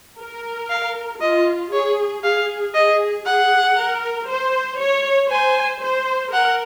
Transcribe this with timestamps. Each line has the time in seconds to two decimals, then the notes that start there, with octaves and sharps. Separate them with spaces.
0.19 A#4
0.70 F5
1.21 F4 D#5
1.73 G#4 C#5
2.24 G#4 F5
2.74 G#4 D#5
3.25 G#4 F#5
3.77 A#4
4.28 C5
4.79 C#5
5.31 C5 G#5
5.83 C5
6.33 A#4 F#5